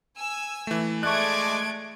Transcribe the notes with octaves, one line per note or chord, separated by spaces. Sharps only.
G#5 E6
E3 A3
G#3 A3 D5 C#6 F#6 G#6 D7